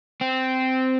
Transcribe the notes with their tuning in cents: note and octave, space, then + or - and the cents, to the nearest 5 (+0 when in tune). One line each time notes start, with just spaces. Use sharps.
C4 -10